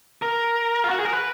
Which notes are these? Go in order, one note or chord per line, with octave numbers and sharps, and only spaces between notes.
A#4
F4
F#4
G#4
A#4
B4